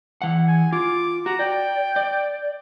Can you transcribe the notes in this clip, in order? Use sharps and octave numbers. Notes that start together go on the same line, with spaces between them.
E3 F#5
G#5
F4 D6
F#4 A#5
D5 G5
D5